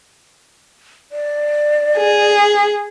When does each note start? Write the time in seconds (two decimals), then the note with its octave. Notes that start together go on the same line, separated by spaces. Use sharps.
1.12 D5
1.97 G#4